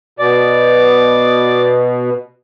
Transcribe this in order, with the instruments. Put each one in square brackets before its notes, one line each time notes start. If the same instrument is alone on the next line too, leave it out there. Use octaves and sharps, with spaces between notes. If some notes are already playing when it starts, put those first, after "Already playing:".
[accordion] B2 [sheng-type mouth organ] D5